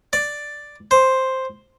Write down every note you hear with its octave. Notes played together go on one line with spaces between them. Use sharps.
D5
C5